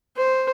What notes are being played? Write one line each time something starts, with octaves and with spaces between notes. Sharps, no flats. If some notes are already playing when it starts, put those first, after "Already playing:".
C5